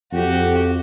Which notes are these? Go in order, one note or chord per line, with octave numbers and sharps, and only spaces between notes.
F2 F#4 G4